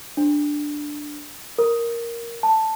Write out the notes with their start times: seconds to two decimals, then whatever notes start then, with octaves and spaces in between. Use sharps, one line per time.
0.17 D4
1.58 A#4
2.43 A5